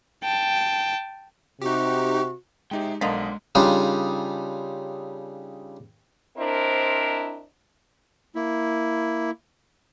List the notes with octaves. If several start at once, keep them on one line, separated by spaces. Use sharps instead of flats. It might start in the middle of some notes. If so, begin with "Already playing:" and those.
G5 A5
C3 D#4 F#4 G4
G#3 D#4 G4 E5 G5
B1 D3 F3 G#3 A#3 D#5 B6
C#3 G3 D4 D#4 F4
C4 D4 E4 A#4 C5 D#5
A#3 E4